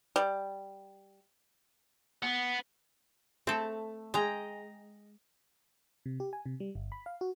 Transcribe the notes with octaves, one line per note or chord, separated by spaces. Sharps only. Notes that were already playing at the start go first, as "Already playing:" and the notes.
G3
B3
A3 C4 A4
G#3 D#5 G5 A#5
C3
G4
G#5
C3
G3
G1
B5
F5
F#4